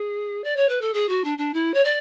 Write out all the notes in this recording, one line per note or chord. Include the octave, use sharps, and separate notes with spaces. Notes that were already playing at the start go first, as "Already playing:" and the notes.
Already playing: G#4
D5
C#5
B4
A4
G#4
F#4
D4
D4
E4
C#5
D5